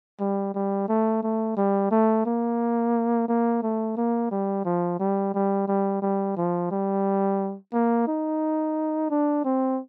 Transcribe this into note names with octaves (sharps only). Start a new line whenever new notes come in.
G3
G3
A3
A3
G3
A3
A#3
A#3
A3
A#3
G3
F3
G3
G3
G3
G3
F3
G3
A#3
D#4
D4
C4